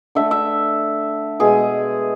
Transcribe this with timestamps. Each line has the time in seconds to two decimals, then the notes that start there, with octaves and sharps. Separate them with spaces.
0.15 D3 A3 E5
0.31 E5
1.40 B2 G#3 G#4